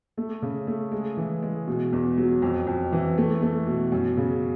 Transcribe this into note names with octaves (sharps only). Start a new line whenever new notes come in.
A3
C#3
A3
G#3
E3
G#3
B2
E2
F#3
F2
F2
E3
A3
A3
B2
F#2
C#3